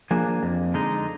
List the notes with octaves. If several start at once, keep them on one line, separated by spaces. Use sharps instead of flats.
F3 A#3 D4 G#4
F2
D3 G#3 D#4